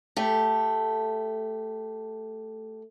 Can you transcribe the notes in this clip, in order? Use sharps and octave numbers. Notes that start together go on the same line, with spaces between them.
A3 G4